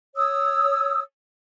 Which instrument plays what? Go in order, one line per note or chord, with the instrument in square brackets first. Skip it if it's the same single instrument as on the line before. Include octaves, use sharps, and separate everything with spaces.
[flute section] C#5 D#6 E6